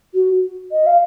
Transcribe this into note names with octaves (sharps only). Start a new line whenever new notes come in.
F#4
D#5
F5